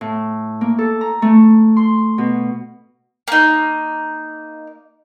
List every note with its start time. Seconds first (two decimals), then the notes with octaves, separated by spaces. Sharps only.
0.01 A2
0.61 A#3
0.79 A4
1.01 A#5
1.22 A3
1.77 C6
2.18 B2
3.28 A#3 D#4